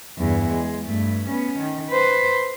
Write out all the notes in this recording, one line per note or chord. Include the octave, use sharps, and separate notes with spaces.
E2 G2
G#3
G2 A3
B3 C#4
D#3
B4 C5